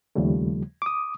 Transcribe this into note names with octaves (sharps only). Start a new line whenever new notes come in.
D#2 C#3 F3 G3 A3
D6 D#6